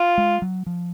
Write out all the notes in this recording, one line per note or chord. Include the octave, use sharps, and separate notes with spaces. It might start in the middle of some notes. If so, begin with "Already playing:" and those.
Already playing: F4
G#3
F#3
F3